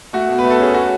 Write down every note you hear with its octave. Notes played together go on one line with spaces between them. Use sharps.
A3 F#4
B2
B4
A3
A4
C#4 G#4
F#4